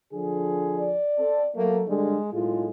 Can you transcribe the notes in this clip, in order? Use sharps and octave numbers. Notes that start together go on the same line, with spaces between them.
D3 F3 G#4
D5
C4 A4
F#3 A3 A#3
D3 G3 G#3
B1 A2 G#3 F4